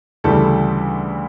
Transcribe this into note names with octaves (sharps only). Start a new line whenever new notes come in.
D2 C#3 E3 G3 A4